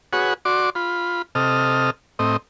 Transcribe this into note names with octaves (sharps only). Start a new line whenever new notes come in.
F#4 G#4 B4 C#5 F#5
F#4 D5 C6 D6
F4 B5
C3 A4 D#5 F6
A2 C4 D#5